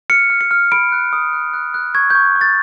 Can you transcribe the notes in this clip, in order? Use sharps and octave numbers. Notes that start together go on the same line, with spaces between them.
F6 C#7
F6
C#7
F6
B5 D7
F#6
D#6
F#6
F#6
F#6
C#6 G#6
C#6 G6
C#6
A6